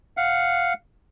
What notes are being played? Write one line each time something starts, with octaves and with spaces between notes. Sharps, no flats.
F5 F#5